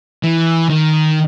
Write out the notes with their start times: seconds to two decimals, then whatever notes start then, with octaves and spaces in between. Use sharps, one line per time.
0.23 E3
0.69 D#3